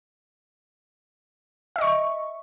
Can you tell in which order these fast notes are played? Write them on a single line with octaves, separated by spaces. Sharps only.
E5 D#5 C#6